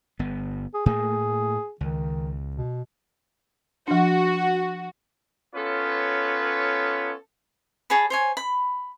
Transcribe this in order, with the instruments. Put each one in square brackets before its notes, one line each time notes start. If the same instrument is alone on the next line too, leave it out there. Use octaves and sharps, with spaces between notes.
[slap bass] G1 B3
[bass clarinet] G#4
[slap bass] A2 A3 A#3 [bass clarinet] G#4
[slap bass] C#2 [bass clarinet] D#3
[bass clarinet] B2
[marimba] F3 D4 [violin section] F#4
[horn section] B3 C#4 F4 A4 B4 C#5
[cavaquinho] G#4 C#5 A5 B5
C5 C#5 G#5
B5